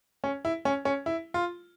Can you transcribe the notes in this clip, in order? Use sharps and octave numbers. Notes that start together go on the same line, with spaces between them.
C#4
E4
C#4
C#4
E4
F4